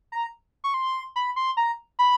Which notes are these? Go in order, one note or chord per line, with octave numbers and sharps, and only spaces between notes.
A#5
C#6
C6
B5
C6
A#5
B5